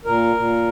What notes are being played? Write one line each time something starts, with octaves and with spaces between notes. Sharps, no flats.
A#2 A#4
A#2